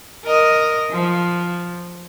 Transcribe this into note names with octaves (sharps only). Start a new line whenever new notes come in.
A#4 D#5
F3